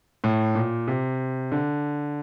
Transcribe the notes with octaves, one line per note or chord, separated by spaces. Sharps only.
A2
A#2
C3
D3